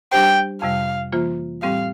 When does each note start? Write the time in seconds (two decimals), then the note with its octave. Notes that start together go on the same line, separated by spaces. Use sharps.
0.12 G3 D4 G4 C5 G5
0.62 F2 C3 G3 F5
1.12 E3 A#3 F4 C5
1.62 A2 G3 C4 G4 F5